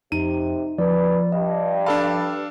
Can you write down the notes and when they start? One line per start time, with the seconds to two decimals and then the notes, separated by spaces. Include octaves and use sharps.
0.12 F2 C3 D#4 D#7
0.78 F3 F4 B4 D5
1.32 G2 D#5
1.86 D4 A4 F5 B5